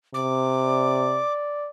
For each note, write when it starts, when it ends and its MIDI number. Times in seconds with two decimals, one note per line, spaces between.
0.14 1.21 48
0.14 1.33 86
0.63 1.70 74